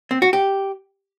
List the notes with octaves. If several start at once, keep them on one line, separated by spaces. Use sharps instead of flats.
C4
F#4
G4